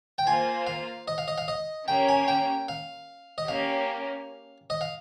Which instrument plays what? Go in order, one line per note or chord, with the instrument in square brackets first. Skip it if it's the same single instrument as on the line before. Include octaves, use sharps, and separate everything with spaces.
[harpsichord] G5
[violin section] A#3 F4 C5 [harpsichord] G#5
[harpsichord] F5
D#5
F5
D#5
F5
D#5
[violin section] A#3 C#4 G4 C#5 [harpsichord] G5
[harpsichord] G#5
G5
F5
D#5
[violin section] A#3 C#4 G4 [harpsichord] F5
[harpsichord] D#5
F5